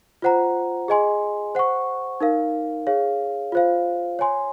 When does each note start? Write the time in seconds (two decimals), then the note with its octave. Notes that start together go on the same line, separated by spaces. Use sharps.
0.22 F4 C5 F#5 A#5
0.88 G#4 D#5 G#5 C6
1.55 C5 F#5 C#6
2.20 D#4 A#4 F5
2.87 G#4 C#5 F5
3.52 F4 C5 F5
4.19 C#5 G#5 C6